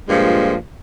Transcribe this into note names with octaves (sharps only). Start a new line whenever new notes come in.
G2 A#2 F3 G#3